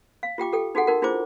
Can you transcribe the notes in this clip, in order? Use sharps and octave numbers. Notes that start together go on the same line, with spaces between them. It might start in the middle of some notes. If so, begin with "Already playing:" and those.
F5
F4 G4 G5 D6
G4 A4 G5
D#4 F#4 G#4 A4 F#5
D#4 F#4 A#4 F#5
D4 E4 F4 G#4 C5 D6